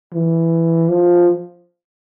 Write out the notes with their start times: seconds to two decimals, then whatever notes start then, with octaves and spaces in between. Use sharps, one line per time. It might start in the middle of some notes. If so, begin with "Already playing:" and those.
0.14 E3
0.89 F3